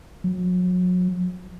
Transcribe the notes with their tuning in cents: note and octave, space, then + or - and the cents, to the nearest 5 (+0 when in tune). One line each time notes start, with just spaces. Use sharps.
F#3 -35